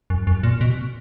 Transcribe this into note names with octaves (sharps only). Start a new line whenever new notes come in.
F#2
F#2
A#2
B2